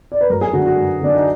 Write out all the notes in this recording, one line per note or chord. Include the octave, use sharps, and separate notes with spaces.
D5
B4
F#2 A#4
G#4
D3 F#3 F#4
F#4
F#2
D3 F#3 D4
D#4